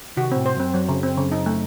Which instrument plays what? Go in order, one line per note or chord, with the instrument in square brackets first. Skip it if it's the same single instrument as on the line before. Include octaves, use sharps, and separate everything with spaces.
[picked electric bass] C3 D#3 [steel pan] F#4
[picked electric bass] A2 C3 [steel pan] C4
[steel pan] C5
[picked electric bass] F#2 [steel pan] C4
[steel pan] F#3
C#3
C4
C#3
D#4
A3